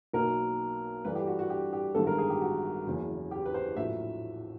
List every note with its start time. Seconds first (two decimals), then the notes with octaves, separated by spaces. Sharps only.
0.13 B1 B2 F#3 A#3 D#4 A#4
1.05 G2 E3 A3 D4 B4
1.15 G4
1.27 F#4
1.39 F#4
1.50 G4
1.73 G4
1.95 A1 G2 D#3 G#3 B3 A4
2.07 A#4
2.18 G#4
2.30 G4
2.41 F#4
2.86 F#1 E2 C#3 F#3
3.31 G4
3.46 B4
3.54 C5
3.76 A#1 A2 F#3 E5